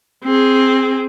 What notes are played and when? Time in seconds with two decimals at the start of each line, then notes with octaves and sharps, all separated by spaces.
0.24 C4 G#4